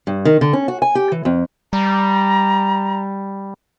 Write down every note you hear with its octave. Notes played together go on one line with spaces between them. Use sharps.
G2
D#3
D3
C#4
F#4
G#5
G4
E3
F2
G3 A#5